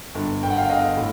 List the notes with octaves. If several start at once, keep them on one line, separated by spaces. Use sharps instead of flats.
G1
G1 G5
F#5
F5 G5
D3 D#5 F5
A2